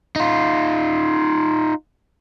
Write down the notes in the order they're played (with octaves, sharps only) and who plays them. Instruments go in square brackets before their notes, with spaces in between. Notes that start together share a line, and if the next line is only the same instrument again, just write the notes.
[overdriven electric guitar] D#4 F4